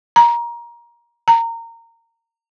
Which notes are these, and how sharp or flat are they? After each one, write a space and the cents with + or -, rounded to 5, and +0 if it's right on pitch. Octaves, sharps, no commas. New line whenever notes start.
A#5 +20
A#5 -20